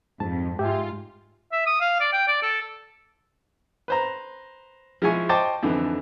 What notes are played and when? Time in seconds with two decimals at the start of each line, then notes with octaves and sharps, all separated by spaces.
0.20 F2 G#2 A5
0.59 G#2 F4 G4 E5 G#5
1.52 E5
1.67 D#6
1.81 F5
2.00 D5
2.13 G5
2.28 D5
2.43 A4
3.88 B4 C5 A#5
5.02 F3 G#3 E4 G#5 C#6
5.29 C5 D#5 G5 A5 C#6 D6
5.63 F2 G#2 D3 E3